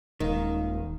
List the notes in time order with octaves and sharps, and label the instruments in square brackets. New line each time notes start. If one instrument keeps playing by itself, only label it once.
[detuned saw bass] D#1 [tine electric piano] D#2 G#3 F5 [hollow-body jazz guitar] D#3